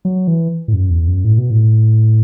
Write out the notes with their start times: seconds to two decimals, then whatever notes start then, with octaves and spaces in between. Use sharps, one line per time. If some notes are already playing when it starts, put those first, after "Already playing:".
0.05 F#3
0.27 E3
0.68 A2
0.73 F#2
0.90 E2
1.08 F#2
1.24 A2
1.38 B2
1.51 A2